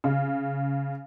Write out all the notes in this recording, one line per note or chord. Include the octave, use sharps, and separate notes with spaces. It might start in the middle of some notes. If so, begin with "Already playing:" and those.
C#3